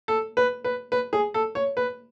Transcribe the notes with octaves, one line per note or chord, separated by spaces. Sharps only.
A4
B4
B4
B4
G#4
A4
C#5
B4